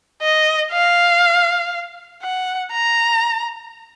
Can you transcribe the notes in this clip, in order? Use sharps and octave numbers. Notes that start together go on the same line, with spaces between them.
D#5
F5
F#5
A#5